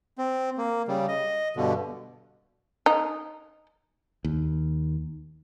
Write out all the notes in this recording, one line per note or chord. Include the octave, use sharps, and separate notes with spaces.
C4
A#3
C#3 G3
D#5
G2 B2 D3
D#4
D#2